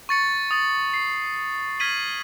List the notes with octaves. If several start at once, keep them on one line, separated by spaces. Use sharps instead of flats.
C#6 A6 C#7
D#6 A6 F#7
C7
F6 G#6 B6 D#7 F#7